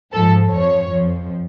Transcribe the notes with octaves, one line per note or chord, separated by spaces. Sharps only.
G#2 F3 A4
F2 F3 C#5
F2 F3